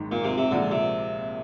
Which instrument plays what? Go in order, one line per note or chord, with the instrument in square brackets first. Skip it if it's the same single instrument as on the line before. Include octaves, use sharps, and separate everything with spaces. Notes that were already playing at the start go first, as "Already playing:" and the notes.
Already playing: [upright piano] G#1 G#2 D#3
[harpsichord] A#2
C3
C3
[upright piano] A#1 A#2 G#3 [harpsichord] D3
[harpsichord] C3